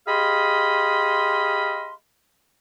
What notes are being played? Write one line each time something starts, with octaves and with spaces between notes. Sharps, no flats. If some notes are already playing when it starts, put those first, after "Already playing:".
G4 G#4 D#5 F5 B5 C6